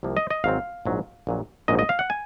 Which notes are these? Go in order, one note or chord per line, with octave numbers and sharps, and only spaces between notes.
C2 C3 F3 A#3
D#5
D#5
G#1 G#2 F#3 C4 F5
A#1 G#2 F#3
A#1 A#2 F#3
A#1 G#2 F#3 A#3 D#5
D#5
F5
F#5
G#5